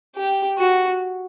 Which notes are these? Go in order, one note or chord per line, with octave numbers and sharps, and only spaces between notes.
G4
F#4